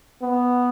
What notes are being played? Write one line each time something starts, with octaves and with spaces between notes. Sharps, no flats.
B3